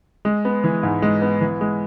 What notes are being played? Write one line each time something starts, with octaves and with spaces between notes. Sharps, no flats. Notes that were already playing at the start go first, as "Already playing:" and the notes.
G#3
B3
E3
G#2
G#3
B3
E3
G#3